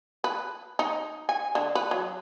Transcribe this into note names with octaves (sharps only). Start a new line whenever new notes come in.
B4
D#4
G#5
D3
B4
F#3